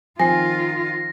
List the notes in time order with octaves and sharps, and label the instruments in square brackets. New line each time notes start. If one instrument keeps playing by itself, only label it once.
[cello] D#3 F4 [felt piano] F3 C4 C7 [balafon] G#5 [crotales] A#6